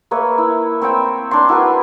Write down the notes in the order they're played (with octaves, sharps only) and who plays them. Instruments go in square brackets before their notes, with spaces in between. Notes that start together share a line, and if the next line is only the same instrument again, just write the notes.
[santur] A#3 B4 C#5 E5
E4
C4 C5 C#5 G5
D4 C#5 C6
E4 F#4 A#4 B4